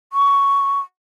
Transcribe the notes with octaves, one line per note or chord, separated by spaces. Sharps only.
C#6